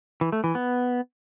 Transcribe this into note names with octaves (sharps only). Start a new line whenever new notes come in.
E3
A3
E3
B3